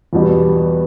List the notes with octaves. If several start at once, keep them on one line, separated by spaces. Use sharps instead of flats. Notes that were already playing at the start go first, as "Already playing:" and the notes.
E2 B2 G3 B3